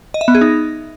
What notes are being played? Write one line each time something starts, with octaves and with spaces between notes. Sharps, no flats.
D#5
E5
B3
G#4
D#4